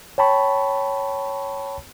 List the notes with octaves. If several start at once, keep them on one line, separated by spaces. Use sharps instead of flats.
C#5 G5 A5 B5 C#6